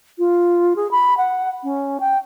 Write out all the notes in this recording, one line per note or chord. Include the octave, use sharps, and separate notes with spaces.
F4
G#4
B5
F#5
C#4
G5